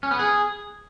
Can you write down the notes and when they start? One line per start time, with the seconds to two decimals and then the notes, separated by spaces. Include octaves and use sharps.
0.03 C#4
0.11 B3
0.19 G#4